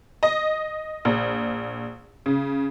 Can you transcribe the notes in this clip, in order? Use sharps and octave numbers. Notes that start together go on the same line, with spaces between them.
D#5
A#1
C#3